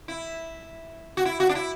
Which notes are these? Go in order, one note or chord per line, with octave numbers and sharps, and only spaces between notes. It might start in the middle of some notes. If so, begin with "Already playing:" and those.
E4
F#4
E4
F#4
D4
E4